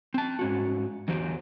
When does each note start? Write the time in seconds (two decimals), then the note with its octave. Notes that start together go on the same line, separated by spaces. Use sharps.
0.14 C4 A5
0.39 G#2 C#4 F#4
1.08 E2 E3 F#3 G4 C5